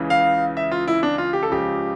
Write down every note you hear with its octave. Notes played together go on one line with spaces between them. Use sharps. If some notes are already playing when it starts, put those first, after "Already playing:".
Already playing: C#2 C#3 E3
F5
E5
F4
E4
D4
F4
G4
A4
C#2 C#3 F3 G4